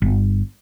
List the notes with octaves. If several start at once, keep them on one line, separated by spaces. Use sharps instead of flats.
G1